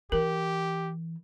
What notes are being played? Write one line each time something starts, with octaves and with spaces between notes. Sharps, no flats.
E3 G4 A#4